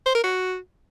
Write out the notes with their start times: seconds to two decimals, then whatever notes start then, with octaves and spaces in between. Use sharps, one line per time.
0.06 C5
0.15 A#4
0.24 F#4